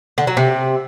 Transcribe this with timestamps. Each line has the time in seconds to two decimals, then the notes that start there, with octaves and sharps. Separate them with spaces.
0.18 D3
0.27 F#3
0.37 C3